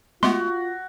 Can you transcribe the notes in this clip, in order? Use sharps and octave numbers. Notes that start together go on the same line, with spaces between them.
G#3 A3 B3 F4 F#4 C6